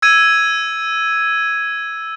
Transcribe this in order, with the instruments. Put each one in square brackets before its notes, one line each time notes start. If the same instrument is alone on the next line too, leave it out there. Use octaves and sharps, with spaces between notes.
[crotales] E6 G#6 D#7